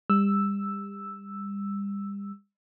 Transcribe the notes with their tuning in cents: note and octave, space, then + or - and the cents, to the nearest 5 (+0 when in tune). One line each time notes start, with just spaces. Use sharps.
G3 +35 E6 +0